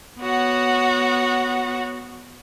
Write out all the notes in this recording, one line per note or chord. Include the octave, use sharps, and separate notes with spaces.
B3 F#4 C#5 F#5